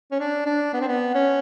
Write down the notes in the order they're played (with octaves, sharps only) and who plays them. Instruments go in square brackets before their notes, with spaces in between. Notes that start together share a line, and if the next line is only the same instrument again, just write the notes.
[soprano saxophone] C#4
D4
D4
B3
C4
B3
C#4